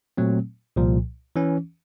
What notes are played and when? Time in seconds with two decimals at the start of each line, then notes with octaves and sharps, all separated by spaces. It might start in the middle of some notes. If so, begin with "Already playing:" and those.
0.17 A#2 F#3 A3 C4
0.76 C2 A#2 F3
1.36 E3 C#4